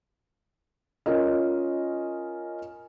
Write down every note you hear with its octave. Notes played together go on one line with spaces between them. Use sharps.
C#4 F4 A#4 D#5